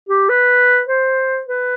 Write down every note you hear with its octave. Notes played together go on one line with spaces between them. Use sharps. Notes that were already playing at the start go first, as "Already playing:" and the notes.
G4
B4
C5
B4